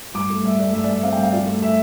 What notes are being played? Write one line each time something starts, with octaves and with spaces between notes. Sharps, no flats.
G2 D6
A3
G2 E5
A3 D5
G2 E5
D5
G2 E5
C4 F5
G5
G2 F5
F3 D5
A3
A3 E5